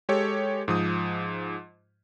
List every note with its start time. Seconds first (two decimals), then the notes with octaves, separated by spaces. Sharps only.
0.09 G#3 G4 A4 C#5
0.68 G#2 F3 D#6